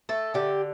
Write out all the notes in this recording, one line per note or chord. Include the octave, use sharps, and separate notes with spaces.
A3 A4
D3 G4